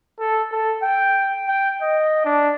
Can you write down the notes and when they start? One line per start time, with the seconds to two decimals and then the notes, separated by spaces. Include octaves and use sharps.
0.19 A4
0.52 A4
0.82 G5
1.48 G5
1.82 D#5
2.25 D4